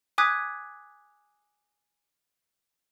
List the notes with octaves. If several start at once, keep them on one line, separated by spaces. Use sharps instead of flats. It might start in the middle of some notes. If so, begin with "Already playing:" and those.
G#5 D6 D#6 F#6 G#6 B6